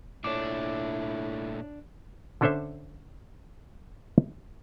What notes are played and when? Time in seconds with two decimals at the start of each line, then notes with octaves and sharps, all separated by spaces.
0.24 A#2 A3 D4 E4 C#5 D6
2.41 D3 C#4 D4 A4 C5 E5